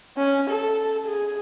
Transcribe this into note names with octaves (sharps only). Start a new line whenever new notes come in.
C#4
A4
G#4